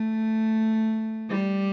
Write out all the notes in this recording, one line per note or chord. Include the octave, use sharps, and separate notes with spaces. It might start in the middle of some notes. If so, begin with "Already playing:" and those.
Already playing: A3
G3